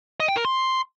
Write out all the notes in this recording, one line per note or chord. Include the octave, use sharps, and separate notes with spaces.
D#5
G5
A#4
C6